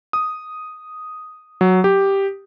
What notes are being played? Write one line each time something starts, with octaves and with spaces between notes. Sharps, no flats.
D#6
F#3
G4